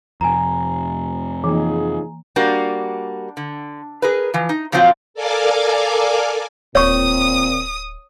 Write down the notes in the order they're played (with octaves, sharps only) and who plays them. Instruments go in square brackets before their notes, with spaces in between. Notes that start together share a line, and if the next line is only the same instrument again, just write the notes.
[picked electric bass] F2 C3 [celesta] G#5 A#5
[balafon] E3 A#3 [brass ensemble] F3 D#4 G#4
[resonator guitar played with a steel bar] G3 A#3 D4 F#4
D3
G#4 A#4 B4
E3 F3
D#4
A#2 F3 F#3 C4 F4
[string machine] A4 A#4 D5 F5 G#5 D6
[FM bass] D1 [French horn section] A#2 C4 [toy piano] C#5 C#6 [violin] D#6